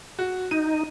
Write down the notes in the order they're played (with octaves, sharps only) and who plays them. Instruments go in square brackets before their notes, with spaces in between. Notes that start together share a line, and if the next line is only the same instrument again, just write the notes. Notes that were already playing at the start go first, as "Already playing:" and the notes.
[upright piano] F#4
[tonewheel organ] D#4 [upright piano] D#7